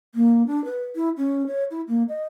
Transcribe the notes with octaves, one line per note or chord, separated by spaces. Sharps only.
A#3
D4
B4
E4
C#4
C#5
E4
A#3
D#5